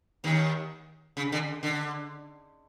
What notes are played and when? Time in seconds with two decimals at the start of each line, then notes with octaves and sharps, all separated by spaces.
0.24 D#2 D#3
1.17 C#3
1.32 D3
1.63 D3